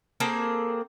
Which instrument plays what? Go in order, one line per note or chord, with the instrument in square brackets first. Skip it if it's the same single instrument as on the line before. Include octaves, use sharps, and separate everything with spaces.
[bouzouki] A#3 C4 G#4 A4